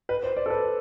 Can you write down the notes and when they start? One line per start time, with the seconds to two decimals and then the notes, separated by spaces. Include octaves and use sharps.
0.09 B4
0.23 C5
0.37 D5
0.46 A4
0.50 B4